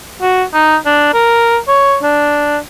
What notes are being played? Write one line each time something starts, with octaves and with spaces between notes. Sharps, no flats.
F#4
D#4
D4
A#4
C#5
D4